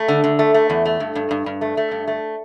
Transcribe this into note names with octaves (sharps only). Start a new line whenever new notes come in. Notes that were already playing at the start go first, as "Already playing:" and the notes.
Already playing: A3
D3
D3
A3
A3
E2
A3
G2
G2
G2
G2
A3
A3
G2
A3